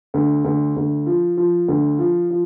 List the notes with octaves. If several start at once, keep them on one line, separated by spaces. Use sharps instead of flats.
D2
D2
D2
F3
F3
D2
F3
F3